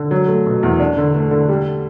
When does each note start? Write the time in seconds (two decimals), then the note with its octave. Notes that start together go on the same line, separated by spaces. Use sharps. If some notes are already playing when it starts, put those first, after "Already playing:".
Already playing: D3
0.11 F#3
0.28 A3
0.46 B2
0.63 E2
0.80 D4
0.97 D3
1.14 A3
1.31 D3
1.49 G3